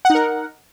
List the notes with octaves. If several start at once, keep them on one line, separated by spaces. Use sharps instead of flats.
D#4 A#4 F#5